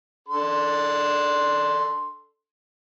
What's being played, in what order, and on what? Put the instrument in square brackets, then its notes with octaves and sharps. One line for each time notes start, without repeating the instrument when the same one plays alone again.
[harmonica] D4 A4 C6